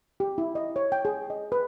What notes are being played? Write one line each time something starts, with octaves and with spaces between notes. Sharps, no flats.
G4
E4
D#5
C#5
G5
G#4
D#5
B4